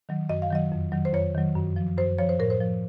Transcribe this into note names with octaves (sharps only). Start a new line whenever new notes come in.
D#3 F#3
F#2 D#5
F5
D#3 F#3 D#5
F2
D#3 F#3
C5
F2 C#5
D#3 F#3
F#2
F3
F#2 C5
F3 C#5
C5
A2 A#4
C5
F3